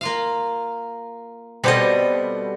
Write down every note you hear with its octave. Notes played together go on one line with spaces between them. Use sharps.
A#3 F4 F5
B2 G3 B3 C4 A4 D#5